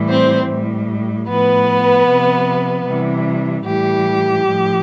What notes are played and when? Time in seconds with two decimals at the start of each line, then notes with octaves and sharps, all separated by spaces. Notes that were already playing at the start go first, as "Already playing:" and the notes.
Already playing: A2 E3 G3
0.09 C4 C5
0.49 A2 G3
1.28 A2 F3 B3 B4
2.08 C3 F3
2.87 C3 E3 G3
3.66 A2 E3 G3 G4
4.46 A2 F3